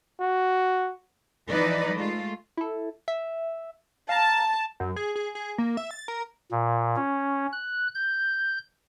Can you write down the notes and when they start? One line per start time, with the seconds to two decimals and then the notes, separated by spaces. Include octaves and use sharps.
0.21 F#4
1.49 E3 F3 D#4 B4 D5 D#5
1.95 G#3 A3 F4
2.57 E4 A4
3.08 E5
4.09 F5 A5 A#5
4.80 F#2
4.96 G#4
5.15 G#4
5.35 G#4
5.58 A#3
5.77 E5
5.91 A6
6.08 A#4
6.51 A#2
6.96 C#4
7.53 F#6
7.95 G6